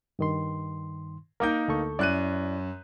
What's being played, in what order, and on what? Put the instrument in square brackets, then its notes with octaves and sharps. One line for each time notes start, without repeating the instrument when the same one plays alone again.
[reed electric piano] G2 D#3 C6
[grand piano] A#3 D#4 G6 [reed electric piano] A#4 D6
[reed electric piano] D2 A4 C#6
[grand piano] F#2 F#6 D#7 [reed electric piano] E4 D5